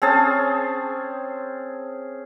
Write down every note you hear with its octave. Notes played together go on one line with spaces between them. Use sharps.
C4 C#4 G#4 A5